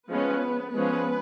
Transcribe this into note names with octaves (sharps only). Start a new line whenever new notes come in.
F3 G#3 B3 C#4 B4
F3 G#3 B3 C#4 B4